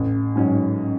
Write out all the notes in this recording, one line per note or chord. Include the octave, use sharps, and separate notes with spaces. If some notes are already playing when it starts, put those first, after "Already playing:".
Already playing: A1
G#2 F#3 C#4